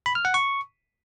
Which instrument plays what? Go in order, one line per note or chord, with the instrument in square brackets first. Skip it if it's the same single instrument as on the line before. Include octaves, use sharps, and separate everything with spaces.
[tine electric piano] B5
F6
F#5
C#6